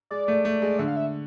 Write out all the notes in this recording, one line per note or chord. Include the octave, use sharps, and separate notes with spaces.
G#3 D5
A3
A3
G#3
D3 E5
F5
E5